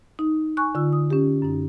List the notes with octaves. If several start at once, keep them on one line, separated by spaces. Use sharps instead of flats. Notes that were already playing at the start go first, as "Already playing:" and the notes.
D#4
G#5 C#6 F#6
D3 F4 E6
D#6
C#4 G4
F#2 D#4